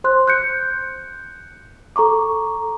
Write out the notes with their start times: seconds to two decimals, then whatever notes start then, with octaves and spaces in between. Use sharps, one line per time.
0.04 C5 C6 F#6
0.28 F#6 G6 C#7
1.96 A4 A#5 C#6 D6